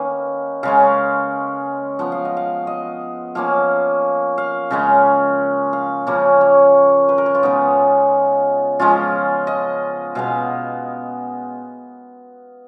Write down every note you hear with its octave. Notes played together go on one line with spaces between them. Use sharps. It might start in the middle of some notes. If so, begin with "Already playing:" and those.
Already playing: D#3 A#3 C#4 B4 F5
C#3 G#3 C#4 F5
F3 B3 F#5
F5
D#5
F5
D#5
F3 A#3 C#4 F5
F5
C#3 G#3 C#4
F5
C#3 F3 A#3 C#4
C#5
B4
A#4
C#5
F4
C#3 G#3 B3 D#4
F3 G#3 C#4 F4
D#5
B2 G#3 B3 F5